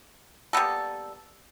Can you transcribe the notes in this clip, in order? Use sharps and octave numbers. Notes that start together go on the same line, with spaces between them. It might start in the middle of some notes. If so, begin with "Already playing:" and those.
G3 A#3 B3 A4